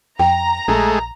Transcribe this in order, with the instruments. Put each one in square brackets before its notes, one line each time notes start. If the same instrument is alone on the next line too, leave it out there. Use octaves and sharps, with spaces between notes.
[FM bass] F2 [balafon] G5 [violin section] A#5
[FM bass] A#1 [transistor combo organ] G#3 A3